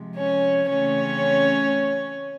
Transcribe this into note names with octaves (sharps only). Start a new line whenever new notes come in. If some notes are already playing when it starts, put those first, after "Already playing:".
Already playing: C3 F3 G#3
C#4 C#5
C#3 E3 A3 C4 C#4 C#5